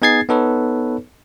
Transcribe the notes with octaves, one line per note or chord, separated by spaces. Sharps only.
B3 D#4 G#4 G#6 A6 C7
B3 D#4 A4 B4 C#5